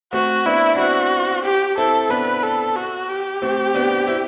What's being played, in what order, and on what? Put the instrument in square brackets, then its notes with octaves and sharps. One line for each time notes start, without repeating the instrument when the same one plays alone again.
[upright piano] A3 C4 [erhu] F#4
[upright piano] B3 D4 [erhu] E4
[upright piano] D4
[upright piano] C4 E4 [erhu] F#4
[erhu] G4
[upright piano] C4 E4 [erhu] A4
[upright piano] B3 D4 [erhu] B4
[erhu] A4
F#4
G4
[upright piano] A3 C4
B3 D4
C4 E4